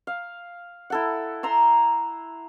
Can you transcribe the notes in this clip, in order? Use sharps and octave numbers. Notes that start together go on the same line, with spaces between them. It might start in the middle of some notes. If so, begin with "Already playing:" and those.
F5
E4 A4 F#5
A#5 C6 E6